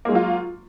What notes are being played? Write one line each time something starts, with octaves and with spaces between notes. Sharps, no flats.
F#3 G#3 A#3 F4